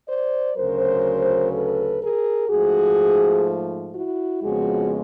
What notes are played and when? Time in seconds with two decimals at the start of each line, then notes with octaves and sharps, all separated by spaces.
0.09 C5 D5
0.57 D2 C#3 F#3 A#4 C5
1.53 A4 B4
2.01 G#4 A#4
2.50 G#2 F3 A3 F#4 G#4
3.94 E4 F#4
4.42 F2 C#3 F3 G#3 B3 F#4 G#4